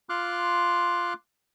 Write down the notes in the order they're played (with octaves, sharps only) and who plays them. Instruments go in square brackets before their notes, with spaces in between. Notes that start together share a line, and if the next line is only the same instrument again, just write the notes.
[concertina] F4 C6 D6 F6 F#6